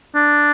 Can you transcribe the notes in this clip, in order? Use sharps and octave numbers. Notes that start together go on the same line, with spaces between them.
D4